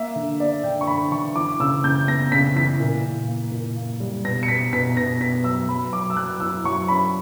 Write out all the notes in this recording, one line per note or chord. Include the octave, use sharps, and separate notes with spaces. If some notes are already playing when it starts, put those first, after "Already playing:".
Already playing: A#3 E5
D3
A#3 D5
D3 G5
C#6
D3 B5
D3 C#6
E3 D6
C#3 E6
C#3 G6
B3 A#6
C#3 B6
E3 B6
A#2
A#2
A#3
A#2
A#3
G3
B2 A#6
C#7
B2 B6
B2 B6
B2 A#6
B2 B6
F#3 E6
F#3 B5
F#3 D6
E6
F#3 F#6
E4 E6
F#3 C#6
C#4 B5